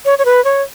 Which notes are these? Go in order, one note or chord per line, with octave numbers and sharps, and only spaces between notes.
C#5
C#5
B4
C#5